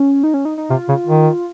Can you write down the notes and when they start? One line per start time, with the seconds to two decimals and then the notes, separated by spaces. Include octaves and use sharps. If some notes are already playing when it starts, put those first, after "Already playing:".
Already playing: C#4
0.24 D#4
0.34 C#4
0.45 D#4
0.58 D#4
0.70 C3 F4
0.89 C#3
1.07 D#3